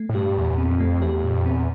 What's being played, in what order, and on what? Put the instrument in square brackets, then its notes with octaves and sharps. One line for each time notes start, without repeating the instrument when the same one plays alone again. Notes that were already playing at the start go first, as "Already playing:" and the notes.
Already playing: [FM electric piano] A3
[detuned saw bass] A2
[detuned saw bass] G2 [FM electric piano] G4
[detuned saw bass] E2 [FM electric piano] A#2
[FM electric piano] C4
[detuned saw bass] F2
[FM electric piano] A3
[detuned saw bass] E2 [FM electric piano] G4
[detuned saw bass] F2 [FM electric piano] A#2
[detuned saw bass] E2 [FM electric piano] C4